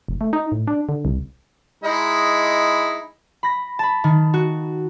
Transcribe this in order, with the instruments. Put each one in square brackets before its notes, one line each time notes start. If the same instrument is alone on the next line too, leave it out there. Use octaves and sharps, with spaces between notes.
[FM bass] F1
A3
D#4
A2
D4
D3
C2
[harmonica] G#3 D#4 E4
[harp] B5 A#6
A5 B5
D#3
F#4